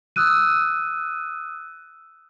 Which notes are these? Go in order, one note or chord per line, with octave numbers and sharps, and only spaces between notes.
D#6 E6 F#6 D#7